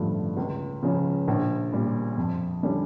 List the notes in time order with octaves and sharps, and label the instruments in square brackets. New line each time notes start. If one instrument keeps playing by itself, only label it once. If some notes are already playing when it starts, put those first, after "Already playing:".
Already playing: [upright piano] A1 G2 D3 F3 A3
C#2
C#3 F3 C#4
A#1
A#2 G3
F2
D3 G3 C#4